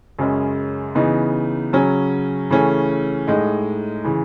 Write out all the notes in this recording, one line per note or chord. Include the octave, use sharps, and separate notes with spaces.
F#2 C#3 G#3 C#4
C#3 E3 B3 D#4
C#3 F#3 C#4
C#3 E3 A3 C#4
A2 G#3 D#4
C#3 E3